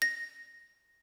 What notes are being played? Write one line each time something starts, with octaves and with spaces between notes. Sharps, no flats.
A#6